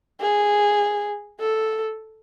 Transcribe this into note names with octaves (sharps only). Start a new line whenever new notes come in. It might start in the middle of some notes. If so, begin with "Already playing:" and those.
G#4
A4